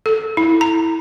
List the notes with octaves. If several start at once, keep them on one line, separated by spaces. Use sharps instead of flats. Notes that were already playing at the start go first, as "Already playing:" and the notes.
A4
E4
A#5